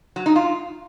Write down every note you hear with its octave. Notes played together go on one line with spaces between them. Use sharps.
F#3
D#4
F4